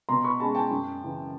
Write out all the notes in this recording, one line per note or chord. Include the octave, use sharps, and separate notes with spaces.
B2 A#5 C6
B5 C#6
G#3 C#4 A5 B5
G5 A5
F#2
C#3 E3